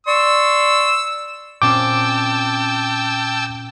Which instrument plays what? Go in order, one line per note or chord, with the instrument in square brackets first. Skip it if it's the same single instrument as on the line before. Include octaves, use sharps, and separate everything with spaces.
[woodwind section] D5 C6 C#6 [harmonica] E6
[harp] A#2 C4 C#4 [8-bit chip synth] G5 A5 E6 [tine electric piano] D6